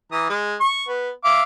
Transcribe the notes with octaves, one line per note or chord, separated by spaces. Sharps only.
E3 A#5 D#6
G#3
C#6
B3
E5 F5 D6